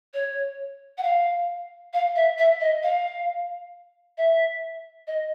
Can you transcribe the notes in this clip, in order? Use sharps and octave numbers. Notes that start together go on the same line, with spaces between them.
C#5
F#5
F5
F5
E5
E5
D#5
F5
E5
D#5